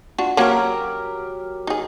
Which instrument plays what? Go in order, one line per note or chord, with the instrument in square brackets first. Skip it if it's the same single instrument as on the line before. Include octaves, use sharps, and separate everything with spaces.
[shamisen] D4 F4 F#4
[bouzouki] F#3 G4 A#4 [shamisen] A#3 C#4 F#4
[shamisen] D#4 G#4